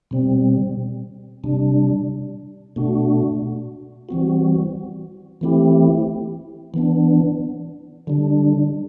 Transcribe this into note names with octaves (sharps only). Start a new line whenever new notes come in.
B2 G3 C4
C3 G3 D4
B2 A3 D4 F#4
E3 G3 C4 F#4
E3 A3 C4 E4 G4
E3 B3 D4
D3 G3 D4